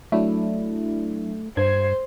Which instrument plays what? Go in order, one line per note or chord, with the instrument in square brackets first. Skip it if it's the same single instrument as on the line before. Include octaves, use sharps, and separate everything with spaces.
[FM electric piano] F#3 D4 E4 [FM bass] A3
[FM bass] G2 [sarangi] C5 [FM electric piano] G#6